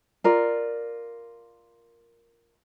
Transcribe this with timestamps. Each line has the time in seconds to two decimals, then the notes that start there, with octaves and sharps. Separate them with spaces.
0.24 F4 A#4 D5